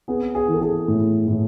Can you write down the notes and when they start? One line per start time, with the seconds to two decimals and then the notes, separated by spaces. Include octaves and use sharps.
0.08 B3 G#4
0.35 G#4
0.48 E3
0.54 A4
0.61 G#4
0.88 A2
1.28 A2